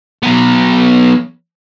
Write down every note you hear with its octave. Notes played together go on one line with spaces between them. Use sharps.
F#3 B3